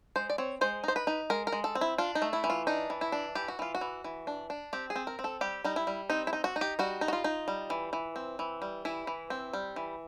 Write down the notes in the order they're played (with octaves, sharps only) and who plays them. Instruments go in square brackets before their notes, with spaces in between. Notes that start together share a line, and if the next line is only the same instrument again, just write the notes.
[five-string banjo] G#3 C5
D5
C4 C#5
G#3 C5
D#4 C5
B4
D#4
G#3 A#4
A#4
G#3
A4
C4
E4
D4 F4
D#4
A3
E4
E3
F4
D4 D#4
E3
E4
D4
E3 G4
F#4
E3 F4
F#4
E3
E3
D4
D4
C4 G4
G#4
C4
A#4
C4
A4
G3 G4
G3 D#4
E4
G3
C4 D#4
E4
D#4
F#4
D#4
G4
G3 F#4
D#4
F#4
F4
D#4
G3
E3
E3
C4
E3
G3
E3 E4
E3
C4
G3
E3